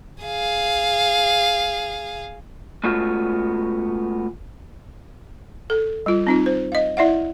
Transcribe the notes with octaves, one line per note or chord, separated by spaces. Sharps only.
G#4 F5
G#3 A3 B3 C#4 F4 F#4
A4
G3 F4
C4 D#4 F4
C5
D#5 F5
E4 D5 E5 F#5